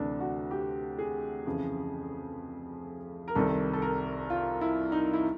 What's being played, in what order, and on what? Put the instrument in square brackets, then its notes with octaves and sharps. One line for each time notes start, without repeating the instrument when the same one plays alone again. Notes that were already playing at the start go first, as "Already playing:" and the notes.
Already playing: [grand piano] D2 C3 E3 D4
F#4
G4
G#4
F2 C#3 E3
A#4
C2 C3 D#3 A4
A4
A#4
F4
E4
D#4
E4